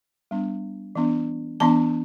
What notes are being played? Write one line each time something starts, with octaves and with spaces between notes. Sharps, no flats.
G3 B3 D4
E3 B3 D4
E3 B3 D4 A5